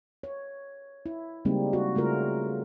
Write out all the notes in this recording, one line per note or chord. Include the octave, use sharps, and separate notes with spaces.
C#5
E4
C#3 G3 G#3 A#3 C4 D#4
F#4
C#3 A3 F4 A#4